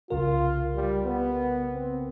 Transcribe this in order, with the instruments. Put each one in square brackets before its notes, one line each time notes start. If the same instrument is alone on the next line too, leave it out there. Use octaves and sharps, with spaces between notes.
[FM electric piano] C2 C#3 A#4 [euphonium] F4
[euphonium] G3
B3
C4